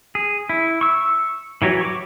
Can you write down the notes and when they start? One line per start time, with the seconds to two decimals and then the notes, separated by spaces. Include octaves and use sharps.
0.15 G#4
0.49 E4
0.81 C#6 E6
1.62 E3 F#3 F#4 G4 C#5
1.81 C#6 D6